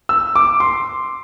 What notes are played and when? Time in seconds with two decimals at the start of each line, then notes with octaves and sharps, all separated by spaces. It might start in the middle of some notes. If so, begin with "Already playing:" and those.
0.09 E6
0.36 D6
0.60 C6